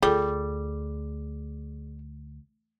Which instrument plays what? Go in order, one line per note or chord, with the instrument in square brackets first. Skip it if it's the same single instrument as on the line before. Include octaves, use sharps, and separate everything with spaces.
[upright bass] D2 [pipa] G3 [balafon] F4 A4 [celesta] G#4